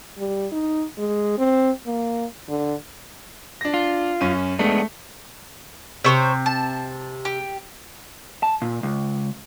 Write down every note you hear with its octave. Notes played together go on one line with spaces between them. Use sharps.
G3
D#4
G#3
C4
A#3
D3
D4 A#6
F4
F#2 C#4 D#7
G#3 A3 B3 D4
C3 C5 C#5 E6
A5
G4
A5
A#2
C#2